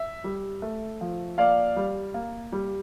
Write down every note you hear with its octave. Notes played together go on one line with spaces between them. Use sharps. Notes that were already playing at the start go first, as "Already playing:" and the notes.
Already playing: E5
G3
A3
F3
A#3 D5 F5
G3
A#3
G3